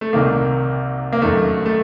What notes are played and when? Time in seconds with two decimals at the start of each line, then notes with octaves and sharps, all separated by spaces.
0.01 A3
0.13 C2 C3 D#3 A#3
1.13 A#3
1.22 F#2 D#3 A3
1.66 A3